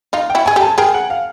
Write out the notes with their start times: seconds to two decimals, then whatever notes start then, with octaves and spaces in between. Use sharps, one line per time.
0.13 D#4 F4 F5
0.30 G5
0.35 E4 F#4
0.46 G#4 G#5
0.56 G4 A4
0.62 A5
0.78 G#4 A#4 G5
0.94 F#5
1.10 F5